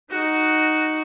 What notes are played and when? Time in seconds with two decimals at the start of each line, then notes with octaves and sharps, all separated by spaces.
0.10 D#4 F#4